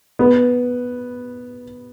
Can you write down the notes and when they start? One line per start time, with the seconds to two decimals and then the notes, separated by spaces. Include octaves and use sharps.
0.19 B3